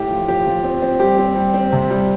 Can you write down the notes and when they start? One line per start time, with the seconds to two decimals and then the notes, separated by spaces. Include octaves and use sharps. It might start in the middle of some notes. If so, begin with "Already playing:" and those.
Already playing: A2 G4
0.11 F3
0.28 F3 G4
0.47 F3
0.64 C4
0.82 C4
1.00 G3 G4
1.18 C4
1.36 G3
1.54 C4
1.72 C3
1.90 G3